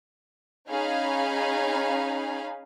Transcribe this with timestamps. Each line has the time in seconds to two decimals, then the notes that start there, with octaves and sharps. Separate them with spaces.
0.69 C#4 D#4 G#4 F5 G#5 B5